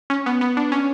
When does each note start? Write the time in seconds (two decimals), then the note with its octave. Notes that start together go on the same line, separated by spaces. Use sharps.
0.10 C#4
0.26 B3
0.41 B3
0.57 D4
0.72 C#4